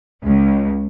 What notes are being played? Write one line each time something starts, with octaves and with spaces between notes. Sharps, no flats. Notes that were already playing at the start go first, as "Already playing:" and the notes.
C#2